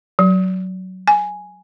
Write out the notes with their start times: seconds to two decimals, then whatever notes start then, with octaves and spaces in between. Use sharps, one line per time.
0.19 F#3
1.07 G#5